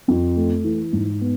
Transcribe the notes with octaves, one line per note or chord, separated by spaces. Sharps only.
F2
A3
E3
G#2
B3